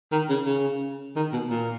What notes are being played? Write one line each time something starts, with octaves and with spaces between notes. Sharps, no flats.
D#3
C#3
C#3
D#3
B2
A#2